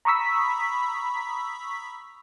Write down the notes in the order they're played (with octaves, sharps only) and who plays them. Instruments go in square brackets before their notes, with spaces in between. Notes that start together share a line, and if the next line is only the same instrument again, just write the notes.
[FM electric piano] A#5 B5 C#6 D#6 E6 B6